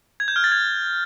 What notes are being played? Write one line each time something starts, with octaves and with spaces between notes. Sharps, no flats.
G#6
G6
F6
A6
G#6